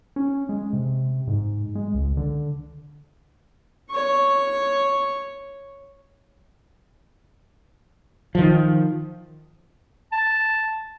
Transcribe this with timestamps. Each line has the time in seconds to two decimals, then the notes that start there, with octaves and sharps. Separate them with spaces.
0.16 C#4
0.49 G#3
0.73 C3
1.27 G#2
1.75 G#3
1.94 C#2
2.17 D3
3.90 C#5 C#6
8.35 D#3 F3
10.12 A5